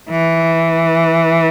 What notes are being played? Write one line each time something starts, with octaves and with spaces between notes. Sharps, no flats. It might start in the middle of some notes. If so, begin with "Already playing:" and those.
E3